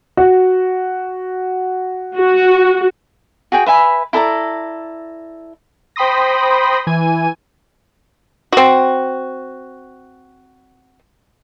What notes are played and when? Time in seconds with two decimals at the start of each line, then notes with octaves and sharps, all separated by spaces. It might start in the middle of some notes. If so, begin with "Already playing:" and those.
0.17 F#4
2.16 F#4
3.52 F#4 G#4 G5
3.66 B4 E5 G#5 B5
4.13 E4 A4 D5 A#5
5.96 C5 G5 B5 C6 D#6 A#6
6.87 E3 G#5 D#7
8.52 C4 F#4